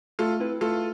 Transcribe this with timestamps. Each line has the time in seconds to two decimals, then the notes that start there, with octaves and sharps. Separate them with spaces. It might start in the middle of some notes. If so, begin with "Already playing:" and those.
0.19 A3 F4 A4
0.40 C4 E4 B4
0.61 A3 F4 A4